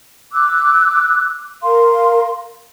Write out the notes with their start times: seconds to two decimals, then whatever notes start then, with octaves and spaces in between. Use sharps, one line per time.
0.33 D6 E6 F#6
1.62 A#4 F5 C6